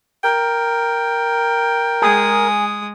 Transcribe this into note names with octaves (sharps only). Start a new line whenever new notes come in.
A#4 G5
G#3 G#4 D#6